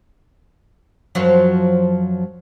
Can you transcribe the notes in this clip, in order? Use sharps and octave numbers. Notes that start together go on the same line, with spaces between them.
F#2 F3 F#3